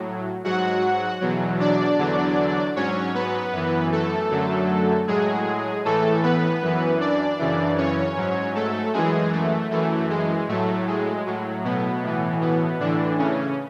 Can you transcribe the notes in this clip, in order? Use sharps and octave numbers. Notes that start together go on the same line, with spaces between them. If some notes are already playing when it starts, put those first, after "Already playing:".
Already playing: A2 F#3
G#2 F#3 F#4 F#5
E2 B2 F#3
D4 D5
E2 D3 F#3
G#2 F#3 C#4 C#5
B3 B4
F#2 E3
A3 A4
F#2 D3 F#3
A2 F#3 G#3 G#4
A2 E3 A3 A4
B3 B4
F#2 E3
D4 D5
F#2 C#3 E3
C#4 C#5
G#2 F#3
A3 A4
F#2 E3 G#3 G#4
A3
F#2 E3 A3
G#3
A2 F#3 A3
G#3
A2 F#3
B2 B3
A2 E3
B2 B3
A2 D3 E3 D4
C#3 C#4